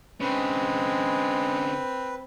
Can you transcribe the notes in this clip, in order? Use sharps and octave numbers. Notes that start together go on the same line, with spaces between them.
D3 G#3 C4 C#4 B4